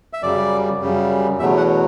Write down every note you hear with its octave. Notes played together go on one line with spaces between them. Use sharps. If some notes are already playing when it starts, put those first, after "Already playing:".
E5
F#2 C#3 G3 D5
F#2 C#3 G3
E2 B2 F#3 A3 E5
F#5